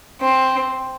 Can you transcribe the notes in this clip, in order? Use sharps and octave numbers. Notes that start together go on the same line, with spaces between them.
C4